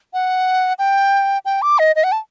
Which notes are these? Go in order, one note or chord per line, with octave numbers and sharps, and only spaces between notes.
F#5
G5
G5
D6
D#5
D#5
F#5
A5